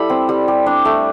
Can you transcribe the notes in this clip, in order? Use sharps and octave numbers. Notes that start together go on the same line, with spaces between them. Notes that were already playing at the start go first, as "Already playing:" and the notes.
Already playing: G3 E4 A4 B5
C4
G3
G3
D4
A3